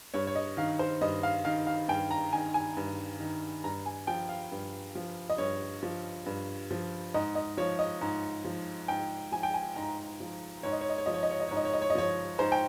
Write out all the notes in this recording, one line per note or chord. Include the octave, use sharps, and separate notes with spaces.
G2 C#5
C#5
D#5
D#3 F5
C5
G2 D#5
F5
D#3 F5
F5
G2 G5
A#5
D#3 G#5
G#5
G2
D#3
G2 A#5
G#5
F3 G5
F5
G2
F3
D#5
G2 C#5
F3
G2
F3
G#2 D#5
D#5
F3 C#5
D#5
G#2
F3
G#2 G5
F3 G#5
G5
G#5
G#2 A#5
F3
G#2 C#5
D#5
C#5
D#5
C#5
F3 D#5
C#5
D#5
C#5
D#5
G#2 C#5
D#5
C#5
D#5
C#5
D#5
F3 C#5
G#2 C5
G5